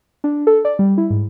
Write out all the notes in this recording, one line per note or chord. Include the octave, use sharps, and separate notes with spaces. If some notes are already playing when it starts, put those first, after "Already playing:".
D4
A4
D5
G3
E4
G#2